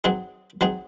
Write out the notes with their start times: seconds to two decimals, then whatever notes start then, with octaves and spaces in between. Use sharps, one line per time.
0.04 F#3 C4 D#4 G#4
0.61 F#3 C4 D#4 G#4